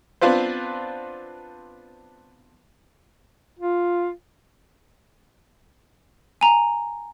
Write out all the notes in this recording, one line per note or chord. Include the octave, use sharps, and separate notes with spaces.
B3 C4 D4 F4 B4 C5
F4
G#5 A#5